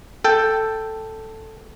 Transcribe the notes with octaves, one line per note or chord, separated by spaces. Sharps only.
A4 G5